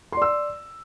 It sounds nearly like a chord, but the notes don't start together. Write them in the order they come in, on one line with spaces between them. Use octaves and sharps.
C6 D5 E6